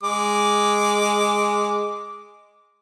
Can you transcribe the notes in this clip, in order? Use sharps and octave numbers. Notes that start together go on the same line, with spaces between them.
G#3 D6